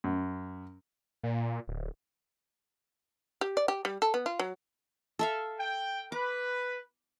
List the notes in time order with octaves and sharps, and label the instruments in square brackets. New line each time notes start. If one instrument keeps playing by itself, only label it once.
[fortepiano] F#2
[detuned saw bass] A#2
D1
[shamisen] G4
D5
G4
G3
A4
B3
F4
F#3
[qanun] A4 E5 F5
[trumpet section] G5
[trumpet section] B4 [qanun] D6